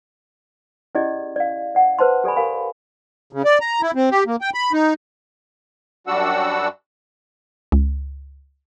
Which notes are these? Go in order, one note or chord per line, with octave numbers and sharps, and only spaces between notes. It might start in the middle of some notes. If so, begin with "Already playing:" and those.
C#4 E4 G4 G#4 D5 D#5
D5 F5
D5 F#5
B4 C5 A5 C6
G4 A4 D5 G#5 B5
G4 A#4 F5 G#5 B5
C#3
D5
A#5
E4
C4
G4
A#3
G5
B5
D#4
F#2 G3 D4 F#4 F#5 E6
C#2